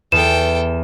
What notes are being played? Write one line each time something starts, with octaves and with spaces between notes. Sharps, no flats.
E2 A4 G5 E7